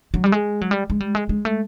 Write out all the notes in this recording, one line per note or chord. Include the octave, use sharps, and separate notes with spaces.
F#3
G3
G#3
F#3
G3
G#3
G3
G#3
G#3
A3